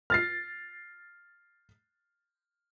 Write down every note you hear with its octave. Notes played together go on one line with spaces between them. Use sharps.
F6 A6 C7